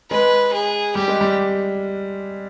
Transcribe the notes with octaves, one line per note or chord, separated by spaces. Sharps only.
G#3 B4
G#4
G3 G4
G#3
G3